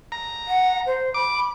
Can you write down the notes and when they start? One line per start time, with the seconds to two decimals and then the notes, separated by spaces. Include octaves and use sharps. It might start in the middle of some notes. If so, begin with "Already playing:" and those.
0.12 A#5
0.48 F#5
0.86 C5
1.14 B5 D6